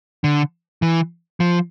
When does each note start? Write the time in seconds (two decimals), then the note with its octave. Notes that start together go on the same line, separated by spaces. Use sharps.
0.24 D3
0.82 E3
1.40 F3